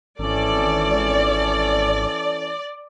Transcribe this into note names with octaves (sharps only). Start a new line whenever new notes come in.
G#1 E3 C#4 A4 D5